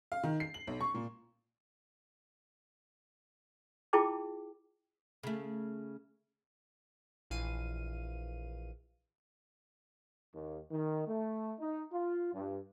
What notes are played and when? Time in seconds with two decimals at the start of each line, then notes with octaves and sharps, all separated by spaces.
0.12 F5
0.24 D#3
0.40 C7
0.54 F#7
0.67 B1
0.81 C#6
0.95 A#2
3.93 E4 F4 G#4 G5 A5 D6
5.23 C#3 A3
7.30 A#1 E3 F5 D#7
10.34 D#2
10.71 D#3
11.08 A3
11.60 D#4
11.92 F4
12.33 G2